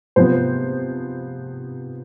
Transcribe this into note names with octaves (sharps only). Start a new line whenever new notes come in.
C3 F3 B3 C5